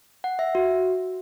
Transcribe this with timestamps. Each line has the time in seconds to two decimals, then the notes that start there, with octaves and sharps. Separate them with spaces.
0.24 F#5
0.39 E5
0.55 F#4